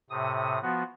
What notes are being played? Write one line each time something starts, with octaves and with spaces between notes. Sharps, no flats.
A2 C3 D#6
F3 B3 F#4